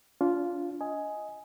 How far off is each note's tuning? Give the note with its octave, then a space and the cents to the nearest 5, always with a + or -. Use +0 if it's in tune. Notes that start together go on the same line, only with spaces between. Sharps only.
D4 -30 F4 +0
D#5 +10 G#5 +10